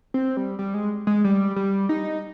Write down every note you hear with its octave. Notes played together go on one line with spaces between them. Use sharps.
C4
G3
G3
G#3
G#3
G3
G3
D#4